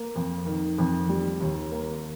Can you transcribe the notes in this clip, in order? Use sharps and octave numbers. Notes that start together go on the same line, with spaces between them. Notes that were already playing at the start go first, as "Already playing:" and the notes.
Already playing: A#3
F2
D#3
F2
G3
D#2
A#3